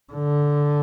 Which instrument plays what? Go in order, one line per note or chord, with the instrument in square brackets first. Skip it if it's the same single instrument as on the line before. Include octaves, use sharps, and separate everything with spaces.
[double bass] D3